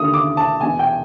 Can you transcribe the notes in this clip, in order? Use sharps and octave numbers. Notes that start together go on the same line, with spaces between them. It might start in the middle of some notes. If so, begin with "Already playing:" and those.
Already playing: D#2 D3 D#6
D6
A5
E2 B2 G#5
G5